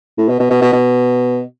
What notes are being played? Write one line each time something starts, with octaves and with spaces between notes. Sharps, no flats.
A2
B2
B2
B2
B2
B2